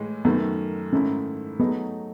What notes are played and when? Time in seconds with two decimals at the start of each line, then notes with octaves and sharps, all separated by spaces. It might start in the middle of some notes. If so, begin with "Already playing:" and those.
Already playing: A2 E3 G#3
0.25 F#2 D#3 A3 B3
0.93 G#2 D#3 A3 C#4 E4
1.59 F#3 A3 B3 D#4 G#4